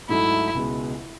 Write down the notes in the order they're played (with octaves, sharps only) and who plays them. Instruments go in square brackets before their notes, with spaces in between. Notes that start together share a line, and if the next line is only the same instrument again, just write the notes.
[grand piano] G#2 F#3 A3 D#4 [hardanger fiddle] E4
[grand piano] C#2 B2 G#3